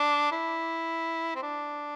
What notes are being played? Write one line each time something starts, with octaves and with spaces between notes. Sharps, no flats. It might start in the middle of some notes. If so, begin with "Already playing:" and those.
Already playing: D4
E4
C4
D4